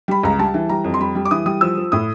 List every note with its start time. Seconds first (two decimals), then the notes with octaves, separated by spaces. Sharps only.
0.08 G3 B5
0.23 C#2 A#5
0.39 G3 A5
0.54 E3
0.69 G3 A#5
0.84 F2
0.94 C6
1.00 G3 B5
1.15 G3
1.25 D6
1.31 E3 D#6
1.46 G3 D#6
1.61 F3 E6
1.77 F3
1.92 A2 D#6